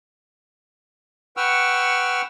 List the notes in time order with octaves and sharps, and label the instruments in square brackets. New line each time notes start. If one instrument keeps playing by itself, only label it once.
[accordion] B4 F#5 G5 C#6 E6 F6